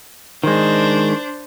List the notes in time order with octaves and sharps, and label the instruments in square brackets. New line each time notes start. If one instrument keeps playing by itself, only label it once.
[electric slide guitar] D#3 G#3 [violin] D4 C5